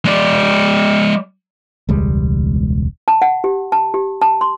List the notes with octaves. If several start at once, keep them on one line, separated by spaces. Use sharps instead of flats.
G#3 D5
E1 C#2 G3 G#3
A5
F#5
G4
A5
G4
A5
C6